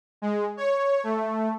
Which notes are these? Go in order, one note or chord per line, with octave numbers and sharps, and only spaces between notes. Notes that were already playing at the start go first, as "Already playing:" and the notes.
G#3
C#5
A3